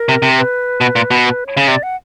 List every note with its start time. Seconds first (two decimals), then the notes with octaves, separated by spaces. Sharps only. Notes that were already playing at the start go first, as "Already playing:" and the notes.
Already playing: A#4
0.09 C3
0.22 C3
0.38 B4
0.81 B2
0.96 A#2
1.11 B2
1.25 B4
1.47 C#5
1.57 C#3
1.68 C3 D5
1.83 F#5